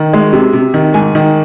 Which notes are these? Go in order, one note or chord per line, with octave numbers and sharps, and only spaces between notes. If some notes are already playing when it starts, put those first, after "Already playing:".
Already playing: D#3
G#3
C3
C3
D#3
G#2 G#5
D#3